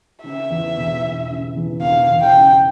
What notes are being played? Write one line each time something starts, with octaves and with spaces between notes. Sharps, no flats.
C#3 E5
E2
E1
E1
C#3
E2
E1 F5
E1
G5
C#3